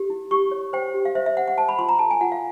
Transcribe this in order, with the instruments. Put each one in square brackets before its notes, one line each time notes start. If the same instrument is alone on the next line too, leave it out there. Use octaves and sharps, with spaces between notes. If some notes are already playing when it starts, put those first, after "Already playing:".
Already playing: [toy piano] G4
E4
G4 C#6
C#5
C5 G5
G4
F5
C5 E5
E5
C5 F#5
F#5
C5 A5
B5
F4 C6
A#5
A4 A5
G#5
F4 F#5
F5